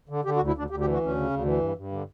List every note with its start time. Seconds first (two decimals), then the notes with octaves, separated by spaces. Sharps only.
0.09 D3
0.25 D3 G4
0.36 F#4
0.40 D2
0.47 E4
0.56 D2 D4
0.70 D2 G4
0.81 G4
0.85 E3
0.93 F#4
1.01 D2 C#4
1.15 C#3
1.31 D2
1.45 E3
1.60 G2
1.76 G2
1.92 D3